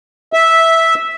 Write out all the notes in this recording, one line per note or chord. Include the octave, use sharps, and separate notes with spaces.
E5